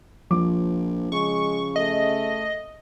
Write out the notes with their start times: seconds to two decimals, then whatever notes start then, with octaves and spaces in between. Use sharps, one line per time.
0.30 A#1 F3 D6
1.12 C#3 G#3 C#6
1.76 A3 D#5